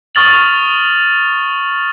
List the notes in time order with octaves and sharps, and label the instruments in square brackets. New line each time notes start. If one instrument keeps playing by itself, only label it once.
[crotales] C#6 D#6 F6 A6 F7 F#7